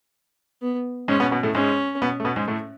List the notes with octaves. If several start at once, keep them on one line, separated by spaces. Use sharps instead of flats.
B3
G#2 G#3 C#4
B2 B3
B2 B3
A2 A3
G#2 G#3 C#4
B2 B3
A3
B2 B3
G#2 G#3
A2 A3